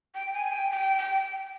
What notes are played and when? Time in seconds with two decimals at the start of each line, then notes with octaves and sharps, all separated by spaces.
0.14 G5
0.33 G#5
0.52 G5
0.71 G5
0.98 G5